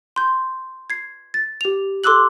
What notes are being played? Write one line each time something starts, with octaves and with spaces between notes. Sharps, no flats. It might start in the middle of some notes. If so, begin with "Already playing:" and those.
C6 G6
G#6 C7
A6
G4 F7
A4 C6 D6 E6 F#6 F#7